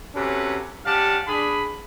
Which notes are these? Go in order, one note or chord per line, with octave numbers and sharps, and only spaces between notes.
C3 C#4 F#4 G4 A4 B4
C#4 G4 D5 F5 F#5 A5
D4 G#4 B5